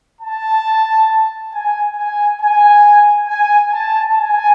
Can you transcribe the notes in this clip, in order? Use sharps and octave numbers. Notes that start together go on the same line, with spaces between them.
A5
G#5
G#5
G#5
G#5
A5
G#5